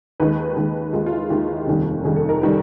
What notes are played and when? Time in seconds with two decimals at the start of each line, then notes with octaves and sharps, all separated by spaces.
0.20 D#2 D#3 G#3 B4
0.56 D#2 D#3 G#3
0.93 D#2 D#3 G#3 F4
1.06 F4
1.12 E4
1.30 D#2 D#3 G#3 G4
1.67 F1 D#2 D#3 G3
2.04 F1 D#2 D#3 G3 G#4
2.16 A4
2.29 A#4
2.41 D#3 G3 B4